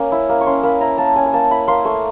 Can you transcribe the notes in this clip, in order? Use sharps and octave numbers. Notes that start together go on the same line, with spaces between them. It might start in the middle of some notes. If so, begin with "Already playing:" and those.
Already playing: A#3 C#4
E4
A#3
C#6
C#4 C6
A#3 B5
E4 A#5
A#3 A5
C#4 G#5
G#5
A#3 A5
E4 B5
A#3 C6
A3 C#6